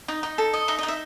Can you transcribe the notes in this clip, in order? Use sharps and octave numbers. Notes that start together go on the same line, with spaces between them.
D#4
D#4
A4
D#5
D#4 E5
D#5
D#4
E5